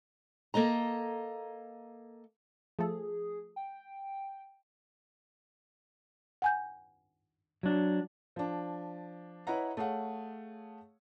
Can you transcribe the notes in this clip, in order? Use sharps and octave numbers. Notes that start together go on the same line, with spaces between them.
A#3 A4 D#5 A#5
F3 A3 G#4 A4
G5
F#5 G#5 G6
F#3 D4
F3 D4
E4 B4 C#5 D#5 F#5 A#5
A3 G#4 C#5 F5 F#5